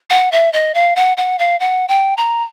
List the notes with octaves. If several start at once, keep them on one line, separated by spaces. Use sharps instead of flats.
F#5
E5
D#5
F5
F#5
F#5
F5
F#5
G5
A#5